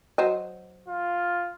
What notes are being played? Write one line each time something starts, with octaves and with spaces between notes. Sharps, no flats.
F#3 C5 D#5
F4